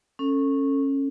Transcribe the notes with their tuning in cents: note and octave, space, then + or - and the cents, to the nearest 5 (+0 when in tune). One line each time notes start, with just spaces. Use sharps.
C#4 -15 A4 +25